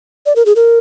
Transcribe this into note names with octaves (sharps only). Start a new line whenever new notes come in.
D5
A#4
G#4
A#4